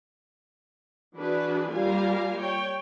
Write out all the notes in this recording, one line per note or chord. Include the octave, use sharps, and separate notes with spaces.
E3 D4 F#4 G#4 B4
G3 A#3 F4 F5 G#5 A#5
C#5 G5